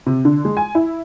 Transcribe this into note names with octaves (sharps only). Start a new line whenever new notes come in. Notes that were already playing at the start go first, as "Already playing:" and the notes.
C3
D3
G#3
G#5
E4